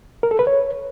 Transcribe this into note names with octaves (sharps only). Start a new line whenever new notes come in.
A#4
A4
B4
C#5